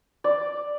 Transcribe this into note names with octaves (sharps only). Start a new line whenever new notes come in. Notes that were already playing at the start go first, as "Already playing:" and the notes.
D5